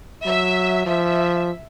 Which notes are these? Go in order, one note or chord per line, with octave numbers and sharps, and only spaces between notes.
F#3 E5
F3 E5